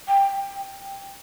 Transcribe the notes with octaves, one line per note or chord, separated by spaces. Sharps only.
G5